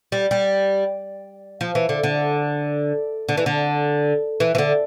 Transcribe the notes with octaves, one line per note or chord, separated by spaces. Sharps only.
G3
G3
F3
E3
D3
D3
D3
E3
D3
E3
E3
D3